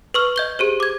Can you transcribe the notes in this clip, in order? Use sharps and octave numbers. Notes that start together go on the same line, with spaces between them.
B4 C#6 F6
D#5 G6 G7
G4 G#4 C5
D6 G#6